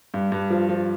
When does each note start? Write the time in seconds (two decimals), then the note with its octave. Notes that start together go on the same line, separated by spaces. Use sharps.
0.14 G2
0.32 G2
0.50 F3
0.69 F3